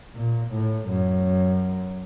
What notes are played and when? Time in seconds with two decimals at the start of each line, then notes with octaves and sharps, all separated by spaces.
0.16 A#2
0.53 A2
0.89 F#2